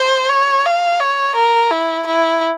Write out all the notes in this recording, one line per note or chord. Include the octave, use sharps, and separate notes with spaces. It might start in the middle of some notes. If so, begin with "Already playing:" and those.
Already playing: C5
C#5
F5
C#5
A#4
E4
E4